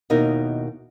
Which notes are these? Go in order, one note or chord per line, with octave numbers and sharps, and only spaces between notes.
D#2 B2 D#4 E4 A#4